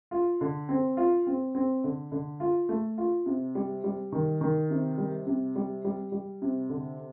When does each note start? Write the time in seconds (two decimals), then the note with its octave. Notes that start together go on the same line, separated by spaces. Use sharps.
0.11 F4
0.41 D3
0.69 C4
0.97 F4
1.27 C4
1.55 C4
1.84 D3
2.12 D3
2.40 F4
2.69 A3
2.98 F4
3.26 C3
3.55 G3
3.84 G3
4.12 D#3
4.41 D#3
4.70 C3
4.98 G3
5.26 C3
5.56 G3
5.85 G3
6.12 G3
6.42 C3
6.70 D3